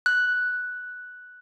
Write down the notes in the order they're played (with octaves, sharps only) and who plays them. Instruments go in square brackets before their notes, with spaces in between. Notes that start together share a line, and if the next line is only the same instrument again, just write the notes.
[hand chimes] F#6